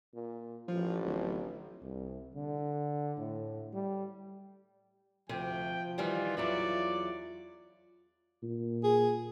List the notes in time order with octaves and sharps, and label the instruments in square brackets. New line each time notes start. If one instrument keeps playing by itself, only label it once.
[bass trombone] A#2
[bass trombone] A1 [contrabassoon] F3
[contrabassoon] D1
[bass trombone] C2
D3
A2
G3
[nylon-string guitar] D2 C3 [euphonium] F3 [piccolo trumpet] G5
[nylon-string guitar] D#3 E3 G3 [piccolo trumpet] F4
[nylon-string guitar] E2 F#3 E4 [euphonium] F4 [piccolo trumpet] D5
[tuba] A#2
[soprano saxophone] G#4